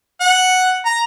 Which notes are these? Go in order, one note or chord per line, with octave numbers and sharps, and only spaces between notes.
F#5
A#5